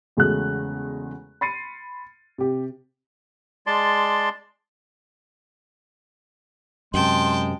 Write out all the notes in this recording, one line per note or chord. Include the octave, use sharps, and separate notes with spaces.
E2 C#3 G#3 A3 F#4 F#6
B5 C6 A6 C7 C#7 D#7
C3 G4
G#3 D5 A5 C6
F#2 C3 G#3 G5 A5 C6